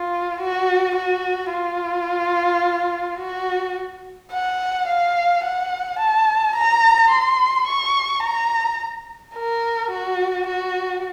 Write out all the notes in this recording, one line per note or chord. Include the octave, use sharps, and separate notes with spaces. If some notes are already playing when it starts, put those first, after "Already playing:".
Already playing: F4
F#4
F#4
F4
F#4
F#5
F5
F#5
A5
A#5
C6
C#6
A#5
A#4
F#4
F#4